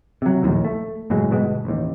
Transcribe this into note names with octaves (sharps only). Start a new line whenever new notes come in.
C3 F#3
A#1 D#2 A2
A3
F#1 A2 F#3 G#3
G1 B2 G#3 B3
A1 D#2